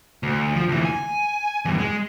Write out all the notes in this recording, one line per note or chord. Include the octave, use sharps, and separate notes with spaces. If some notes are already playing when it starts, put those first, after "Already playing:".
D2
F3
D2 E3
G#5
E2 G2
G#3